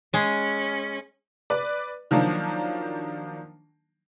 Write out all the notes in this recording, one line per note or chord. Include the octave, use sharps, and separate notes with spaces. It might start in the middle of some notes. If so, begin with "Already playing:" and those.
G#3 C#4
B4 D5
D#3 F3 F#3 A#3 D4